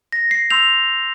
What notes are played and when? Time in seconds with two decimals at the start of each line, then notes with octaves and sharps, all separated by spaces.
0.12 A#6
0.31 C7
0.50 C6 E6 G6 F7